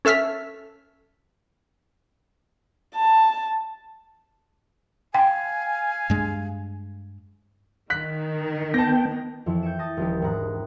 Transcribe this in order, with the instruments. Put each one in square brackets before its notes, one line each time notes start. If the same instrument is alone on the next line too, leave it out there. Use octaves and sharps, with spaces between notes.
[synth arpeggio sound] C#4 A4 E5 F6 B6
[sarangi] A5
[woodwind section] F5 G#5 [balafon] G5
[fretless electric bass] G2 G#3
[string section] D#3 [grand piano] F#6 B6
[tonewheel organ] B3 G5 [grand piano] A5 A#6
[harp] F2 E3 F3
G6 G#6 C#7 D7 E7
A5 D#6 A6 A#6 D#7
D#1 F3 G4
E1 G#2 A#5 F#6